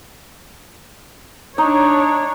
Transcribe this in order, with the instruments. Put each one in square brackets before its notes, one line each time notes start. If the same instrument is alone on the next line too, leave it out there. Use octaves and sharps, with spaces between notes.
[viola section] D4 C#5 [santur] D#4